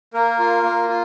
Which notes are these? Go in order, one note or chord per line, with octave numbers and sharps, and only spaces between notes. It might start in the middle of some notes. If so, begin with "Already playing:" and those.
A#3 A#4
F4
A#3
F4